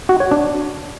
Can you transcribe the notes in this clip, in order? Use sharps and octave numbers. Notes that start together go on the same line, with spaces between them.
F#4
C#5
D4